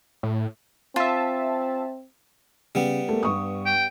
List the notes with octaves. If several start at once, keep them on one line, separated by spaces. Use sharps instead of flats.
A2
C4 F4 E5 A5
C#3 G3 B3
A3 A#3
G2 C#6 D#6
G5